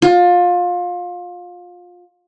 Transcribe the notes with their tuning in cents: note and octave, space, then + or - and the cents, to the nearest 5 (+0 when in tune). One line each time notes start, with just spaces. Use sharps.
F4 +25